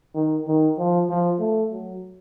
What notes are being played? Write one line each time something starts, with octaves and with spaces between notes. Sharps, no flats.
D#3
D#3
F3
F3
A3
F#3